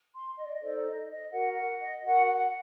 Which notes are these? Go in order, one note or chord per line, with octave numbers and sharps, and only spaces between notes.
C6
D#5
D5
D#5
D#4 A4 C5 D5
D#5
D#5
F#4 A#4 F#5
F#5
D#5
F#4 A#4 F#5
F#5